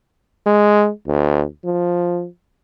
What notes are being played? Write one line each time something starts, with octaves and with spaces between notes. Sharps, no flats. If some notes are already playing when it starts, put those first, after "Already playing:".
G#3
D2
F3